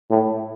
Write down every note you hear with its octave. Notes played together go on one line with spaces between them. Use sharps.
A2